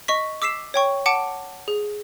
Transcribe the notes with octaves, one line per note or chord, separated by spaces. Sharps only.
D#5 C#6 B6
D6 E6 B6 C7 E7
C#5 G5 C#6
F#5 A5 D6 C#7 D7
G#4